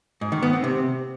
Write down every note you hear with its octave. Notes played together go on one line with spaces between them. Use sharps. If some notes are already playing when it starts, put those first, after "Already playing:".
G#2
D#3
B3
C4
C3